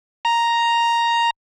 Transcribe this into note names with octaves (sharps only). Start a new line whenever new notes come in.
A#5